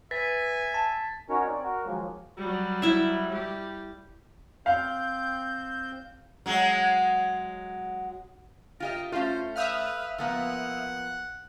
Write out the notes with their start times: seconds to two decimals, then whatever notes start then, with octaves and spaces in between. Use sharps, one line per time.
0.11 B4 E5 G#5 A6 B6
0.74 A5
1.29 C#4 D#4 F#4 A#4 C#5
1.46 C4 D5
1.63 F#4 A#4
1.85 D#3 F3 F#3 G#3 A#3
2.37 F#3 G3
2.82 E4 E5
3.30 G3 G4
4.66 C4 F5 G6
6.46 F#3 G#3
8.80 F4 G4 A#4 D#5
9.12 A3 C#4 F4 C5
9.56 B4 E5 F5 D#6 F6 G6
10.18 F3 A#3 B3 F#5